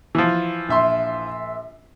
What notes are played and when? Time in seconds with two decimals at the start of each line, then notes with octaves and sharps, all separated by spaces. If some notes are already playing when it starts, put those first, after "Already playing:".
0.15 E3 F3
0.69 A#1 E5 C6